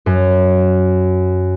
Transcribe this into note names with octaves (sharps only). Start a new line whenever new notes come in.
F#2